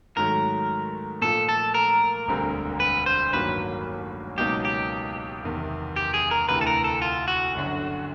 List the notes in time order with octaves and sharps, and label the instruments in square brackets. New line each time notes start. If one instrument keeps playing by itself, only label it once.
[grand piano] G#2 D#3 F#3 A3 [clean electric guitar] A#4
[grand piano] A#2 F3 A3 [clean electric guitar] A4
[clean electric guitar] A4
A#4
[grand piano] E1 D2 D3 G3 C4
[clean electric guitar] B4
C5
[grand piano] A1 G2 D#3 F#3 A#3 [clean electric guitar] B4
[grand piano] C#2 B2 F#3 A#3 D#4 [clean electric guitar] G4
[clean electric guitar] G4
[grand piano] F#1 E2 C3 D#3
[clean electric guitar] G4
G#4
A#4
[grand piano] D2 C3 E3 [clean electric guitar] B4
[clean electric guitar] A4
A#4
A4
F4
F#4
[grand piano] G1 F#2 D3